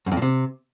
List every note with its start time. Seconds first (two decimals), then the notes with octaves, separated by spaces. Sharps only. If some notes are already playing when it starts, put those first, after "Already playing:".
0.06 F#2
0.12 F2
0.17 A#2
0.22 C3